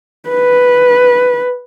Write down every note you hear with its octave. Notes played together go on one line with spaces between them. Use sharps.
B4